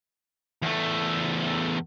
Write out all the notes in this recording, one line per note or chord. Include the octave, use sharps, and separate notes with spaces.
E2 A3